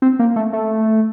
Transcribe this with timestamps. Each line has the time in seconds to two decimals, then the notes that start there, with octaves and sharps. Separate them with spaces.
0.02 C4
0.19 A#3
0.36 A3
0.53 A3